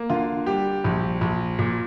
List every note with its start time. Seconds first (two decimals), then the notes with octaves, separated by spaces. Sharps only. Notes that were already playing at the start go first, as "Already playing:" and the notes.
Already playing: A#3
0.10 D3 F4
0.46 G3 G4
0.84 A#1
1.21 A#1
1.59 A#2